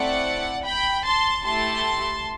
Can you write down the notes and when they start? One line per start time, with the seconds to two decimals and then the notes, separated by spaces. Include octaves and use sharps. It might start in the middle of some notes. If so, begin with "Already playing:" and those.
Already playing: A3 C4 E4 D5 F#5
0.65 G5 B5
1.06 A5 C6
1.46 A3 E4 G4 A5 C6